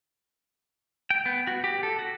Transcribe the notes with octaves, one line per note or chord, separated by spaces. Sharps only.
G5
B3
F#4
G4
A4
F#4